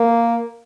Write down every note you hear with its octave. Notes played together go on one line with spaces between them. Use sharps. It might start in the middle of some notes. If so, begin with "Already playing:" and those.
Already playing: A#3